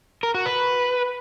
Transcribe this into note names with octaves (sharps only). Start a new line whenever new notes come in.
A#4
F#4
B4